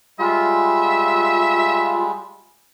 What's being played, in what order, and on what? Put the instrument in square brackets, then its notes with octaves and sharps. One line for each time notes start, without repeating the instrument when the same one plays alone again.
[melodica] G3 G#3 [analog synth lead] F4 [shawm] E5